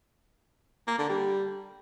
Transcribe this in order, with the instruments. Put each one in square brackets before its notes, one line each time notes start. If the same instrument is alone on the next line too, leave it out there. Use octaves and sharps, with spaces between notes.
[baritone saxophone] A#3
D3
G3